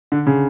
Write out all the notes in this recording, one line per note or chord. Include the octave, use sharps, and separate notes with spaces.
D3
C#3